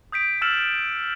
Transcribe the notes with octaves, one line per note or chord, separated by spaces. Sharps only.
D#6 G6 B6 D7
E6 F6 A6 C#7 E7 F#7